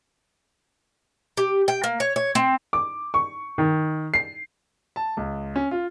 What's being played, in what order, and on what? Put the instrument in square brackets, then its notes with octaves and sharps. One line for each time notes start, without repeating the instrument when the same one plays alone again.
[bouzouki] G4
G5
A#3
C#5
C#5
C4
[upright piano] D6
C#6
D#3
C7
[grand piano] A5
C#2
C#4
F4